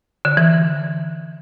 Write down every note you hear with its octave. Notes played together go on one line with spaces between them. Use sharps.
D3
E3